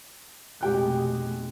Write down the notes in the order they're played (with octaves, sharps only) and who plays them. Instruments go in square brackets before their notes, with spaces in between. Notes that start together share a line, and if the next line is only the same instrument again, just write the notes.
[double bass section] F1 B2 G#3 [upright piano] G4 G5 F#6